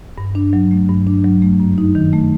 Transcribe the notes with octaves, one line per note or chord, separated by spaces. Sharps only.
G2
D4
F#3
A3
G2
D4
F#3
A3
F#2
D#4
D#3
A3